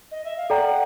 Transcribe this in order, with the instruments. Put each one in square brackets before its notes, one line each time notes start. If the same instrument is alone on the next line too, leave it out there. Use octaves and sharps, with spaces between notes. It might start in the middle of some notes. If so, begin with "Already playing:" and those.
[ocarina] D#5
E5
F5
[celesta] A4 D5 G5 A#5 [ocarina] F#5